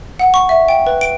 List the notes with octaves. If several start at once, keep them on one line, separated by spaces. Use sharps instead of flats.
F#5
C#6
E5
G5
B4
D7